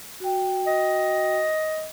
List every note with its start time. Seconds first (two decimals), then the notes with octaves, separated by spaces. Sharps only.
0.20 F#4 G5
0.67 D#5